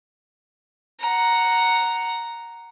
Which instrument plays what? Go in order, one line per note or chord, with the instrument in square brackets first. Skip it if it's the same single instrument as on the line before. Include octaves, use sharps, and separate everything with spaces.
[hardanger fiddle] F#5 A#5